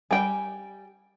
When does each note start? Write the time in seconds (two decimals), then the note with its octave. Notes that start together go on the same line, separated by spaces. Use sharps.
0.11 G3 G5 G#5